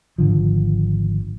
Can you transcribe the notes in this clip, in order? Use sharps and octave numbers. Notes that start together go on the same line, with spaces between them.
G#1 D3 F3